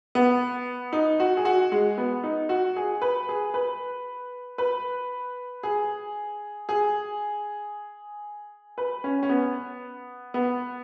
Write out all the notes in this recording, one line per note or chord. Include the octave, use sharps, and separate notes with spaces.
B3
D#4
F#4
G#4
F#4
G#3
B3
D#4
F#4
G#4
B4
G#4
B4
B4
G#4
G#4
B4
C#4
C#4
B3
B3